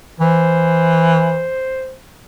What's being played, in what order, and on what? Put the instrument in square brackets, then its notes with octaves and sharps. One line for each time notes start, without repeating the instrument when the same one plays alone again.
[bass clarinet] E3 [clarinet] C5